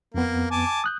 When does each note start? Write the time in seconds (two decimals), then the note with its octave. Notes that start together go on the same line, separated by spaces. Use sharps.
0.14 F2 A#3 B3
0.51 G#5 A5 D6
0.84 D#6 F#6 G6